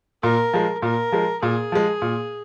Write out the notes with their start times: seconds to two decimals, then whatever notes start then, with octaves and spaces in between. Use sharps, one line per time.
0.23 A#2 A#4
0.53 F3 G#3
0.82 A#2 A#4
1.12 F3 G#3
1.42 A#2 G#4
1.72 F3 G#3
2.02 A#2